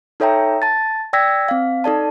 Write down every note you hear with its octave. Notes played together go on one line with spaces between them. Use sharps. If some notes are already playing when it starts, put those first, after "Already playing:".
D#4 A4 C#5 E5 G5 A#5
A5 A6
D5 G5 E6 G#6 A#6 B6
C4 F5
D#4 A4 D5 A5